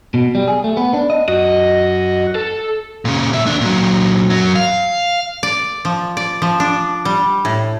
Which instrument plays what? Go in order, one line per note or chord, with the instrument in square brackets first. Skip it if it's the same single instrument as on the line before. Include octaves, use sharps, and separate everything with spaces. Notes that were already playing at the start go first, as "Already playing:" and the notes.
[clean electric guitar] B2
G3
G#4
A3
B3
D4
D#5
[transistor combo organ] F#2 F#4 [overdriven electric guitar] D#5
[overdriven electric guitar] A4
A#2 C#3
A#3 E5
D#2 D4
A#2 F#3
F#2 F#3
F5
[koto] D5
F3
D5
F3
D4
G3
A2